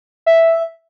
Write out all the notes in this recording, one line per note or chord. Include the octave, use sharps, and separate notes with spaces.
E5